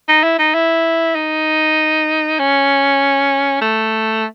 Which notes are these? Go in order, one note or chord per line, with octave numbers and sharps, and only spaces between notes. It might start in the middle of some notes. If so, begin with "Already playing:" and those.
D#4
E4
D#4
E4
D#4
C#4
A3